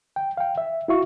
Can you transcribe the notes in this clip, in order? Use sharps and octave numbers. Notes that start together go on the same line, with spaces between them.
G5
F5 G5
E5
E4 F#4 E5 F5 C#6